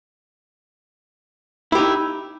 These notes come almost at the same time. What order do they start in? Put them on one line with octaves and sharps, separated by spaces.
E4 G4 D#4